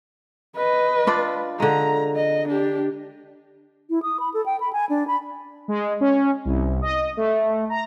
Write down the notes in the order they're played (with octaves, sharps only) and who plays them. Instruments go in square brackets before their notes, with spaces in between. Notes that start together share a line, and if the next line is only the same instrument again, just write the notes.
[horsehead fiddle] B4 D#5
[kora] D4 F4 D5
[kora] D3 G#3 [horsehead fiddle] A#5
[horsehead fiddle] D#5
D4 G4
[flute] E4
D#6
B5
A4
G5
B5
G#5
D4
B5
[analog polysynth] G#3
C#4
C2
D#5
A3
A#5